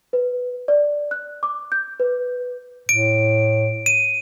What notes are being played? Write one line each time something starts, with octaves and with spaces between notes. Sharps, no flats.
B4
D5
F#6
D6
G6
B4
A2 D7
D#7